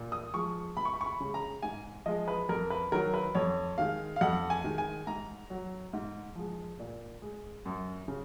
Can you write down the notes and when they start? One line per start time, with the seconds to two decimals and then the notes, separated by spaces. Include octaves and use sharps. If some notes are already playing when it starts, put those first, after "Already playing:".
Already playing: A#2
0.12 D#6
0.34 F3 G#3 C#6
0.76 C#2 B5
0.85 C#6
0.93 B5
1.01 C#6
1.06 B5
1.20 C#3 G#3
1.34 A#5
1.62 G#2 G#5
2.06 F3 G#3 D#5
2.28 B4
2.49 F2 A#4
2.70 B4
2.92 D#3 F#3 A#4
3.14 B4
3.35 F2 C#5
3.78 D#3 G#3 F5
4.16 F5
4.21 F2 F#5
4.50 G#5
4.64 D#3 G#3
4.78 G#5
5.07 G#2 A#5
5.50 F#3
5.93 G#2
6.36 F3 G#3
6.80 A#2
7.22 G#3
7.66 F#2
8.08 C#3